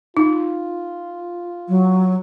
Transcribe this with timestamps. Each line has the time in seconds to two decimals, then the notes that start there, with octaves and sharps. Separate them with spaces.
0.17 D#4 F4
1.69 F#3